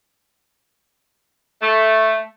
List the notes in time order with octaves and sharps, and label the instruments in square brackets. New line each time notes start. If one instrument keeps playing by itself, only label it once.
[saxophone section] A3